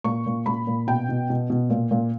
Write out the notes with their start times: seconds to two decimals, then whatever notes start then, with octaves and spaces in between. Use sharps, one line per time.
0.04 A#2 C#6
0.26 A#2
0.46 A#2 B5
0.67 A#2
0.87 B2 G5
1.09 B2
1.30 B2
1.50 B2
1.70 A#2
1.91 A#2